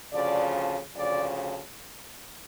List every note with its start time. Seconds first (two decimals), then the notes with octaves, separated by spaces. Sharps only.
0.12 D2 C#3 F3 D5
0.94 D2 C#3 F3 D5